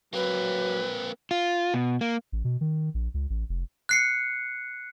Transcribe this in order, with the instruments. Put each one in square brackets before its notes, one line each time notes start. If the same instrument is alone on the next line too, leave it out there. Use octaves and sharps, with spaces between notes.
[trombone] F#3 [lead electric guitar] A#3 C4 [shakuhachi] B4
[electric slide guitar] F4
B2
A#3
[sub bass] A1
B2
D#3
A#1
C#2
A1
F1
[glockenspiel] F#6 C7 C#7